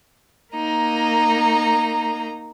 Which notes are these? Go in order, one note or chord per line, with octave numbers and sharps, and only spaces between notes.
A#3 D#4 A#5